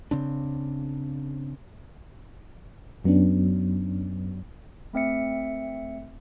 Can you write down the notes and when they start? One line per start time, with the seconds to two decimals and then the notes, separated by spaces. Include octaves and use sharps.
0.11 C#3 C4 D4
3.04 F#2 F#3 B3 C#4 D4
4.93 A3 C4 E5 C#7